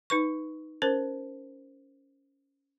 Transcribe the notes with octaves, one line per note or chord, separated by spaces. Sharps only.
D#4 B4 C#6
C#4 A#4 C5